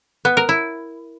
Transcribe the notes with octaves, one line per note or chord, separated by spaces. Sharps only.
B3
A#4
E4